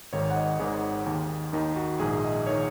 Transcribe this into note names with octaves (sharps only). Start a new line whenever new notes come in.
G#1 G#2 D#3 C#5
F#5
D#5
G#1 G#2 D#3 G#4
D#2 D#3
D#2 D#3 D#4
F#4
A#1 G#2 D#3 G#4
D#5
D#3 C#5